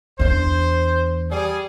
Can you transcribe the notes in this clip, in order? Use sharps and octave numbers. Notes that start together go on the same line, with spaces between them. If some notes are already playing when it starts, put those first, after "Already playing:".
E2 D4 C5
G3 G#4